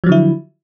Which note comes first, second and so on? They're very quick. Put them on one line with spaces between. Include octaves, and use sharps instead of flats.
F3 F#3 D3 E4